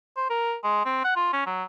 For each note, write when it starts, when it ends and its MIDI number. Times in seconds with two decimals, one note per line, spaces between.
0.17 0.26 72
0.30 0.55 70
0.63 0.84 56
0.85 1.01 60
1.04 1.13 78
1.16 1.29 65
1.33 1.42 61
1.46 1.63 54